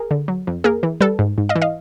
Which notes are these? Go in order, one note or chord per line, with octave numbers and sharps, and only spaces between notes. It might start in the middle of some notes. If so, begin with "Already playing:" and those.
Already playing: G#4 A#4
D3
F#3
F2
A#3 G#4 A#4
E3
G3 A4 B4
G#2
G#2
D#5 F5
E3
D#5 F5